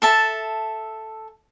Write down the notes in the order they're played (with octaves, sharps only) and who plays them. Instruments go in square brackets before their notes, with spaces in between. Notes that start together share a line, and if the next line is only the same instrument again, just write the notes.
[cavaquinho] A4 E5 A5